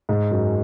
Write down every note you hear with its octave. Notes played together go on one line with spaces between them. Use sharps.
G#2 G#3
F#2 F#3